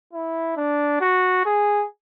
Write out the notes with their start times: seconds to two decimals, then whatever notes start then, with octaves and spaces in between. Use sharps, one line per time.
0.13 E4
0.57 D4
1.01 F#4
1.45 G#4